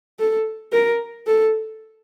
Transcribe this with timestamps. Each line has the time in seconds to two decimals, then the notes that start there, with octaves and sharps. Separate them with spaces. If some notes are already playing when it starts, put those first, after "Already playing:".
0.19 A4
0.72 A#4
1.27 A4